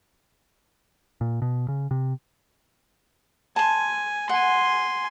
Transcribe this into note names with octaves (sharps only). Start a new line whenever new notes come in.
A#2
B2
C#3
C3
G#5 A5 C6
F#5 G#5 C6